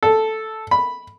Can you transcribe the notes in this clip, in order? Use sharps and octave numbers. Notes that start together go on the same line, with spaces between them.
A4
B5